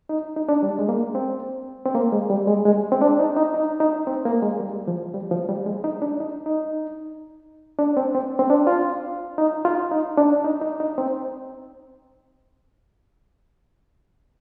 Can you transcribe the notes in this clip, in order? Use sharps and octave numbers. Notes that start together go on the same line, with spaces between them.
D#4
D#4
D4
G3
G#3
A#3
C4
C4
A#3
G#3
G3
G#3
G#3
C4
D4
D#4
D#4
D#4
D#4
C4
A#3
G#3
G3
F3
G3
F3
G3
G#3
D#4
D4
D#4
D#4
D4
C4
C4
C4
D4
F4
D#4
F4
D#4
D4
D#4
D#4
D#4
C4